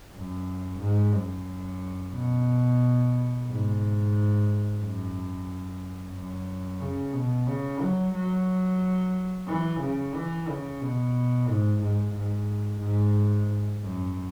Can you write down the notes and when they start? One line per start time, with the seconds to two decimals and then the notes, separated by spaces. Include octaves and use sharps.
0.13 F#2
0.80 G#2
1.13 F#2
2.13 B2
3.47 G#2
4.80 F#2
6.14 F#2
6.80 C#3
7.13 B2
7.47 C#3
7.81 F#3
8.14 F#3
9.47 E3
9.81 C#3
10.14 E3
10.48 C#3
10.81 B2
11.48 G#2
11.81 G#2
12.15 G#2
12.81 G#2
13.81 F#2